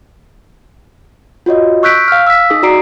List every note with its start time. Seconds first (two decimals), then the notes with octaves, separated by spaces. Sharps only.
1.46 F4 F#4 C#5 D#5
1.83 C#6 E6 F#6 G6 B6 D7
2.08 F5 F6
2.27 E6 B6
2.50 D#4 G#4 D#6
2.62 D#4 F#4 D5 A#5 C7 D7